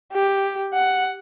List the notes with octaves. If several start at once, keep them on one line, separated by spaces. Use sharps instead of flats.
G4
F#5